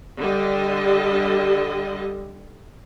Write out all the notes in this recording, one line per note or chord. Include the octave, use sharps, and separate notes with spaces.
D3 G3 G4 D#5